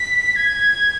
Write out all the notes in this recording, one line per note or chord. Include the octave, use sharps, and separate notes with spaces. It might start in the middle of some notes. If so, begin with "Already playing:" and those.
Already playing: B6
G#6